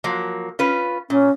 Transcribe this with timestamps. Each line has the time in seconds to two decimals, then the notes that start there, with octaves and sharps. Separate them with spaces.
0.04 F3 F#3 A#3
0.59 C#4 F4 B4
1.10 A#2 C#4